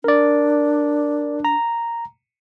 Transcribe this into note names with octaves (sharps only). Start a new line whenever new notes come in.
D4 A#4 D5
A#5